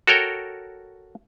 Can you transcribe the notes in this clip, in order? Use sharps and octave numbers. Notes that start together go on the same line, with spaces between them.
F#4 A4 A#4 C#5 G5